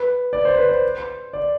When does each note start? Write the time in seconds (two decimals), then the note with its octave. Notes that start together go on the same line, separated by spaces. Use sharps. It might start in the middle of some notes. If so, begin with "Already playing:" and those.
Already playing: B4
0.33 D5
0.45 C5
0.57 B4
0.69 C5
1.33 D5